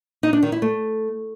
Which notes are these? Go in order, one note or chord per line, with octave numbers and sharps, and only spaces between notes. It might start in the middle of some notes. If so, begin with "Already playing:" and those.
D#4
D4
D#3
E4
A3